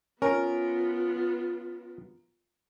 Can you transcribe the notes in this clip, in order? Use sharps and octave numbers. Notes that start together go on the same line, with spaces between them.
B3 C#4 F4 A#4